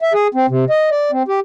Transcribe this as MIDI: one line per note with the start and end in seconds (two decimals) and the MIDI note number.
0.02 0.13 76
0.14 0.28 68
0.34 0.46 60
0.49 0.65 48
0.70 0.90 75
0.91 1.11 74
1.12 1.23 60
1.28 1.40 67